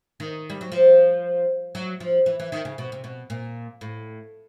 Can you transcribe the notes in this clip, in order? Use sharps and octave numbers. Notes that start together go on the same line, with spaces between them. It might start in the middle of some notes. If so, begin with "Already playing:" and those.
D#3
G3
F#3
F3
F#3
F3
E3
E3
D#3
C#3
B2
C3
B2
A#2
A2